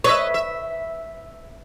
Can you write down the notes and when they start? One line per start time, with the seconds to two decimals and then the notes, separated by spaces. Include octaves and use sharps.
0.04 B4 C#5 D#5 E5
0.34 E5